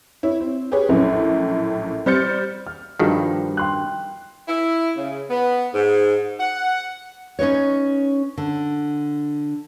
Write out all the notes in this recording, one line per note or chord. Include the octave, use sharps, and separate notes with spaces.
E4 C#5
C4
G4 G#4 B4 C#5
A#1 F#2 A2
G3 C5 F6 G6 A6 C#7
F6
G2 D#3 F3 G3 F#4
G5 C6 F#6
E4
C#3
B3
G#2
F#5
C#4 D#4 B4 C#5
D3